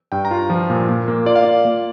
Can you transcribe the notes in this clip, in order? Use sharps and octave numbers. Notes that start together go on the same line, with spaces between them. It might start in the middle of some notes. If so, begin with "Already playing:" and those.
G2 G5
A#5
F4
F3
A#2
A#2
A#3
F4 D5
F5
F4 D5
A#3